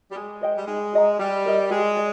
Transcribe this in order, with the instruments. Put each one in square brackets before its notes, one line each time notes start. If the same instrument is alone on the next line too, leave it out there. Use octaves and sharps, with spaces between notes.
[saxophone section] G3
[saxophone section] G#3 [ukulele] G#4
[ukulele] C5 D#5 G5
[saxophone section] G3
[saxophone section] G#3 [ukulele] D#4
[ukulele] G#4 D#5 A#5
[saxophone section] G3 [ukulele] G4
[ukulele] A#4 D#5
[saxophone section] G#3 [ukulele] G4
[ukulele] D5